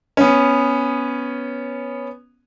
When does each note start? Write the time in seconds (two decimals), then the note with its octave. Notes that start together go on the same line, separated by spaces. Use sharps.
0.17 B3 C#4